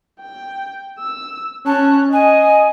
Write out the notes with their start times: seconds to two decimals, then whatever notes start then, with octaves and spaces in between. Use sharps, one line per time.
0.21 G5
0.99 E6
1.66 C#4 A5 F#6
2.13 D#5 G#5